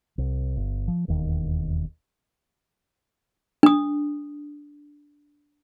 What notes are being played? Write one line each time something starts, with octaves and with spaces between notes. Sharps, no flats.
C2
G1
F3
E1 D#2 D#3
D4 D#6